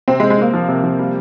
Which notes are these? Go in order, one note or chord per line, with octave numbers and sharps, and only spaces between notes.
C3 C4
G#3
C4
G#3
A#3 C4
F3
C3
F3
G3